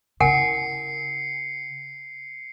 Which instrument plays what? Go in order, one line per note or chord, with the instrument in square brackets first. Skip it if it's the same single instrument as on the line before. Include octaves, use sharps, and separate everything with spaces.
[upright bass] C#3 E4 [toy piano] A#4 F#5 G#5 [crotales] C7 C#7